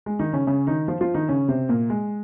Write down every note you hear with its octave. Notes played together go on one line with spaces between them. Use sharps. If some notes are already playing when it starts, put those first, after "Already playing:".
G#3
D#3 D#4
C#3 C#4
C#3 C#4
D#3 D#4
F3 F4
F3 F4
D#3 D#4
C#3 C#4
C3 C4
A#2 A#3
G#3